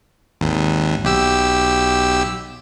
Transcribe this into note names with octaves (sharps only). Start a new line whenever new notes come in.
G#1 D#2
B1 G4 E6